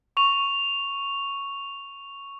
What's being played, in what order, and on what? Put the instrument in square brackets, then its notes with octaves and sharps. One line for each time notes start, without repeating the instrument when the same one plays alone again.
[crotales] C#6 F7